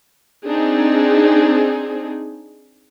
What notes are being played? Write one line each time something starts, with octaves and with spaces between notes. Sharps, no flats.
C4 D4 D#4 G#4